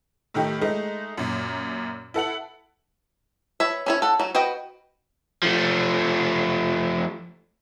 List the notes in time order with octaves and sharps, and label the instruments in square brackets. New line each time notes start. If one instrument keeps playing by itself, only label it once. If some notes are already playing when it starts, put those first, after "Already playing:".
[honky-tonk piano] A2 D#3 A3 D#4 G4
G#3 A3 D#4
F#2 A#2
E4 A4 F#5 F#7
[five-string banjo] B4 C#5 E5
C#4 E4 C#5
A4 F#5
F#3 F#4
F#4 B4 D#5 G5
[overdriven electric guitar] F3 A3